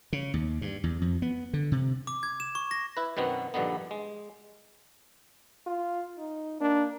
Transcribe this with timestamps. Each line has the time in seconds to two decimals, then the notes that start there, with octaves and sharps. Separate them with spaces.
0.13 C#3
0.34 D#2
0.61 G2
0.84 E2
1.02 F2
1.22 B3
1.53 D3
1.72 C3
2.07 D6
2.23 G#6
2.40 E7
2.55 C#6
2.71 A#6
2.97 E4 B4
3.17 F#2 B2 D#3 B3 C4
3.54 A#1 G2 D3 D#3 B3
3.91 G#3
5.67 F4
6.18 D#4
6.61 A#3 D4